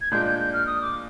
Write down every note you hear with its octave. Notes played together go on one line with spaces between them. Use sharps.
G#6
A#2 G#3 D4 G6
G6
G6
F6
D#6
D6